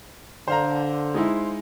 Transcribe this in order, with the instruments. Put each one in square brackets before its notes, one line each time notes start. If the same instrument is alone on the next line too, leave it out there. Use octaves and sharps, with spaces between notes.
[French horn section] D3 [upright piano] C5 F5 A#5
[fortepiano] G#3 D#4 E4